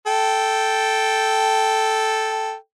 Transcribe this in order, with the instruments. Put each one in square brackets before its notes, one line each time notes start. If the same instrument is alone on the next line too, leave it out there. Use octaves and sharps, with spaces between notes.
[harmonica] A4 G5